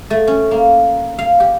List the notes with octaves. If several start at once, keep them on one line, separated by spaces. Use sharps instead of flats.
A3
C#4
A#3
F5
G4